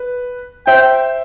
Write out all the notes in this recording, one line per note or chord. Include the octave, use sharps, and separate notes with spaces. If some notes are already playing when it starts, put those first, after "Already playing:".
Already playing: B4
C5 E5 G5